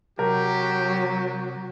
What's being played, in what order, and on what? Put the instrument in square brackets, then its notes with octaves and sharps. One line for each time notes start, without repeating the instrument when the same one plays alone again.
[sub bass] C3 [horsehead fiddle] F#3 [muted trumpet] G4 [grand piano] A#4